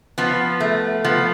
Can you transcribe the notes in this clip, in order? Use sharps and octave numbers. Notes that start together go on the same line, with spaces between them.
F3 B3
A3
F3 B3